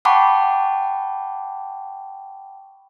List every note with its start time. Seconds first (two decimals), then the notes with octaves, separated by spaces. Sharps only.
0.05 F#5 G5 A5 B5 C#6 D6